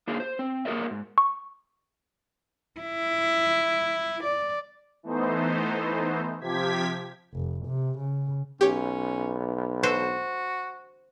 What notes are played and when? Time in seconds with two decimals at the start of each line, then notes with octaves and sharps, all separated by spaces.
0.08 A#3 D4 D#4 F#4 G#4 F5
0.20 C5
0.39 C4
0.65 A#3 F#4 G#4 A#4 D5 E5
0.91 G#2
1.18 C#6
2.80 E4
4.23 D5
5.03 E3 A3 B3 D#4 C5
6.40 C3 F3 G4 G#6 B6
7.35 F1
7.66 C3
7.99 C#3
8.61 B1 C#4 G4 C#5
9.83 F#4 B4 C5 E6